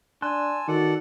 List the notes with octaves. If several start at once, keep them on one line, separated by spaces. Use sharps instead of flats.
D4 G#5 A5 C6 E6 F#6
D#3 F#4 A4 D5 F#5